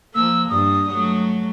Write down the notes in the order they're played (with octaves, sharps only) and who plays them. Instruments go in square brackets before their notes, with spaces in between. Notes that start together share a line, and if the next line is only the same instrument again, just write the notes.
[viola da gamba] F3 A#3 [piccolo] E6
[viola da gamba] G2 [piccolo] D#6
[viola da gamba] F#3 A3